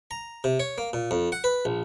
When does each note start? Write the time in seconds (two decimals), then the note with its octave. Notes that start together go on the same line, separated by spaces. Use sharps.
0.11 A#5
0.44 C3
0.60 C#5
0.78 A#3
0.93 A#2
1.11 F2
1.32 F#5
1.44 B4
1.65 A#1